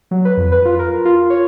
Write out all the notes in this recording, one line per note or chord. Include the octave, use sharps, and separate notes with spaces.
F#3
B4
F2
B4
F4
A#4
F4
C#5